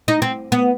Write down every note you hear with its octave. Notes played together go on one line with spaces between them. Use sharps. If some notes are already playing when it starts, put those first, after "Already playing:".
D#4
C4
B3